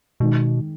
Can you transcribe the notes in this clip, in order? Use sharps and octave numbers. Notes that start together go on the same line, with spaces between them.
B2 D#3 G#3